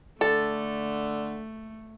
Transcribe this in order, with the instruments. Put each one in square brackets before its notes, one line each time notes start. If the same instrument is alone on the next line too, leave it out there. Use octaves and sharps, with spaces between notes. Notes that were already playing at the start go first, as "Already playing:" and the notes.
[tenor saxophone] D3 [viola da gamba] A3 [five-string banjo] A4